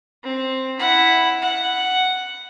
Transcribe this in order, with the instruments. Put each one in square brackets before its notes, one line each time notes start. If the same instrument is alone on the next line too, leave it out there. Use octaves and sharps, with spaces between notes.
[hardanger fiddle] C4
E4 F#5
F#5